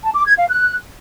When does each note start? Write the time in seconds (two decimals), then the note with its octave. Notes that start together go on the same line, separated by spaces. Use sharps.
0.03 A5
0.14 D6
0.26 G#6
0.37 F5
0.49 F#6